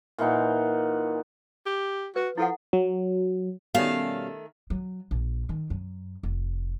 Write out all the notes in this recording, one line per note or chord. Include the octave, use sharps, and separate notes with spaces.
A#2 E3 D#4 F#5
G4
F#4 B4
F3 E4 A4 F#5
F#3
B2 D#3 G3 A3 C#4 F5
F#3
A#1
D#3
F#2
F1